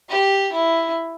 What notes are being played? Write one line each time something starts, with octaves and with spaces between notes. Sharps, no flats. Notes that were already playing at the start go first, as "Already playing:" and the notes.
G4
E4